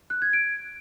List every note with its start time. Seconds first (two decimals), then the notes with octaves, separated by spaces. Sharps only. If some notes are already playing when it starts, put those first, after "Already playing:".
0.10 F#6
0.22 G#6
0.33 D7